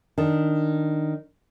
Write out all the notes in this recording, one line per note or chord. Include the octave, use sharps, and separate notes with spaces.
D#3 D4